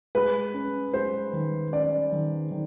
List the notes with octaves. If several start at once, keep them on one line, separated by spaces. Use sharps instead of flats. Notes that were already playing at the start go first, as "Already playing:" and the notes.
G#3 B4
C#4
G#3 C5
D#3
C#4 D5
D#3
D#3